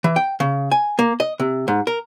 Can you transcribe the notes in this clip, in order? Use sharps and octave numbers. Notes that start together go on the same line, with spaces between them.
E3
G5
C#3
G#5
A#3
D#5
C3
G#2
A#4